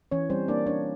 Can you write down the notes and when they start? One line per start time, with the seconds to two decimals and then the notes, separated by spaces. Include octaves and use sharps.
0.11 E3 C#4 C#5
0.30 G3 C4 C5
0.48 A#3 D4 D5
0.66 C#4 D4 C#5